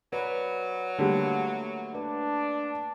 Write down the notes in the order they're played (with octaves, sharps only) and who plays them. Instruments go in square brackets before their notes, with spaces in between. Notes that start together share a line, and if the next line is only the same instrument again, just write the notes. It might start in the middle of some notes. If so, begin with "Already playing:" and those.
[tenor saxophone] F#3 [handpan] B4 D5
[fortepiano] D3 G3 [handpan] A3 A#3
[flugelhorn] D4 [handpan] B4